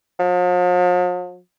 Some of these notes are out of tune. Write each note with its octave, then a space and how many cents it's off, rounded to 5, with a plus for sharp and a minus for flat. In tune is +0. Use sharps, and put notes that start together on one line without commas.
F3 +45